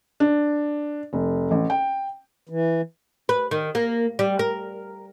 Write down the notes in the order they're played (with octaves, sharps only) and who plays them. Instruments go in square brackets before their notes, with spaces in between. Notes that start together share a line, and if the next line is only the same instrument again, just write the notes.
[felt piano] D4
F1
A1
G5
[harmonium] E3
[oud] B4
D#3
A#3
G3
A#4